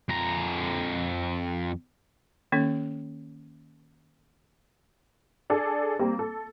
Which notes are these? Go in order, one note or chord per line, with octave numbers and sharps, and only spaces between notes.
F2 A#5
D#3 A#3 C#4 A4
D4 G#4 A4
G3 A#3 C4
A4